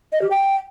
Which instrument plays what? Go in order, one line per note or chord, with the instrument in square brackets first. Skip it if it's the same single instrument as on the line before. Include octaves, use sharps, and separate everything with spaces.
[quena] D#5
G4
G5